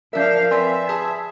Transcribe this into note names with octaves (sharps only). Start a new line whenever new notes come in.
F3 D4 A#4 E5 F5 G6
C4 B4 D5 E5 G#5 C6
G#4 A5